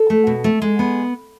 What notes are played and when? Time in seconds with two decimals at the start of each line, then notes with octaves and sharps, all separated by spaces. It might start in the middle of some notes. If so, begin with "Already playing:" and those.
Already playing: A4
0.10 A3
0.27 B2
0.44 A3
0.62 G#3
0.79 B3